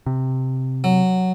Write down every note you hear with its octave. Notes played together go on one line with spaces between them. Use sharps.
C3
F#3